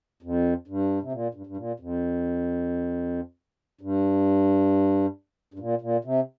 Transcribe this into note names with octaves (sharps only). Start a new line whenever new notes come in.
F2
G2
C3
A#2
G2
G2
A#2
F2
G2
G2
A#2
A#2
C3